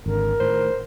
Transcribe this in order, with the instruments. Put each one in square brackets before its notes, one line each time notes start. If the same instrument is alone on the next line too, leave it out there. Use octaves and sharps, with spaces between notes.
[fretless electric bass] G#1 D3 [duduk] A#4
[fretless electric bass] A2 D#3 [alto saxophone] C5